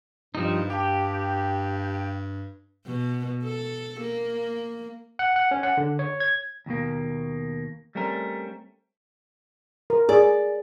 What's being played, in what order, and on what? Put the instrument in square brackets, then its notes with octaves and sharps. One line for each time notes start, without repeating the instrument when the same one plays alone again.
[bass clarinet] G2 [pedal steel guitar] F3 G3 D#4
[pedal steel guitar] G4 [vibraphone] F5 G5 A5
[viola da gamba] B2
A4
A#3
[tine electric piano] F#5
F#5
C#4
F#5
D3
C#5
G#6
[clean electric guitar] D#2 B2 A#3
G3 A3 C4 C#4 A#4
[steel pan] A#4
[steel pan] G#4 [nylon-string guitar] D5